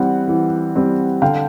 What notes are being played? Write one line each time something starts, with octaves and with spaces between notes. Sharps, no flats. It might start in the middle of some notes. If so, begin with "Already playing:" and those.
Already playing: E3 G3 C4 F#5
E3
G3 C4
D3 F5 G5